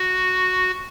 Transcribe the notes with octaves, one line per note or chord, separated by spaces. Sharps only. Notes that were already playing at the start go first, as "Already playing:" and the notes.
Already playing: F#4